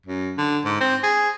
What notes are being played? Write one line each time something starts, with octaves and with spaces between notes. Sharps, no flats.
F#2
D3
G#2
C4
G#4